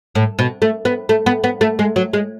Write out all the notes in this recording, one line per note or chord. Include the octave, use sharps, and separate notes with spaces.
A2
B2
A3
B3
A3
B3
B3
A3
G#3
F#3
G#3